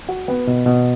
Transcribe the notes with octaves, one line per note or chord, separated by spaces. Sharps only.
F#4
B3
B2
B2